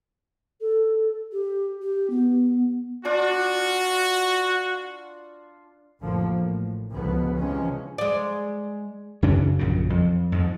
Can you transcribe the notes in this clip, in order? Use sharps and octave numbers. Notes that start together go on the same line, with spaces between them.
A4
G4
G4
B3
D4 F4 F#4 D5
A1 F2 D3 F3 A#3
A2
C#2 D3 F3 F#3 B3
C3 E3 F3 G#3 C#4
G#3 D5
F#2 C#3 C#4 D4
A#1 F#2 A#2 C#3
F2
F2 G#2 F3